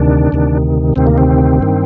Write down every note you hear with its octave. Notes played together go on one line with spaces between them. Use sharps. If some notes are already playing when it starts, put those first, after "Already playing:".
Already playing: D2 C3 D#3 D4
D2 C3 D#3
D2 C3 D#3 C4
A#3
C4
G2 D#3